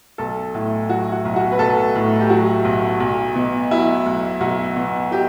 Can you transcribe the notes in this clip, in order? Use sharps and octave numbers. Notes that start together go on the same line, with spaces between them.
B1 A4
A2
F#3 F#4
F#4
B1
F#4
B4
B1 A4
A2
G4
F#3 F#4
B1
B1
B2
F#3 E4
B1
B1 F#4
B2
F#3 G4